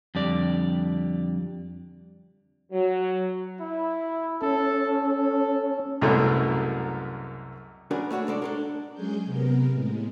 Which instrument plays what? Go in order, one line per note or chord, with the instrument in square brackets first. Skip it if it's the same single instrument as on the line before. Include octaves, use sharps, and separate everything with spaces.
[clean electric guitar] F2 D3 G3 D5
[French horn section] F#3
[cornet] E4
[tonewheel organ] C#4 [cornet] A4
[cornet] A4
[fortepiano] C2 F#2 B2 F#3 G#3 A3
[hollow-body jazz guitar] C#4 D4 F#4 G#4 A#4 B4
A3 D4 F#4 C#5
C2 G#3 A4 D5
D4 A4 A#4
[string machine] F#3 G#3 C#4 G#4 G6
C3 B3 A#4
A2 G#3